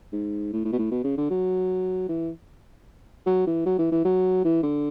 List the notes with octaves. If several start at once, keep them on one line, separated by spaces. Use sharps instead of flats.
G#2
A2
A2
B2
A2
B2
C#3
D3
F#3
E3
F#3
E3
F#3
E3
E3
F#3
E3
D3